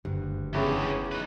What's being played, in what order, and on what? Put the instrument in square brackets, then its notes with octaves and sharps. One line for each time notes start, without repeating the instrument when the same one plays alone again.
[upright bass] F#1 [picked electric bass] D2 G2
[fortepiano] E2 C#3 [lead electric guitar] C#4 G4
[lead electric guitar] D#4 B4